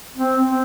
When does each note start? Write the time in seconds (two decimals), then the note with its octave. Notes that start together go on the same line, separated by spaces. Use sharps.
0.15 C4
0.47 C4